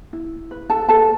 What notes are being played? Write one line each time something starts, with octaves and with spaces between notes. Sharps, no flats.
E4
B4
A4 A5
A4 B4 A5